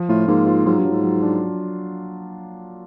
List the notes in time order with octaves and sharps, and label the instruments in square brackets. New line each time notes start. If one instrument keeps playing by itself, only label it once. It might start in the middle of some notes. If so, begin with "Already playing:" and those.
Already playing: [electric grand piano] F3
[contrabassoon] A2 [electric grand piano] F4
[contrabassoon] G#2 [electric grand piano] A#3
[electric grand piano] F4
[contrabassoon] G#2 [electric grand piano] F#3
[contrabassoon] G2
[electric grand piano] F#3
[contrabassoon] G#2
[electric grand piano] F#3
D4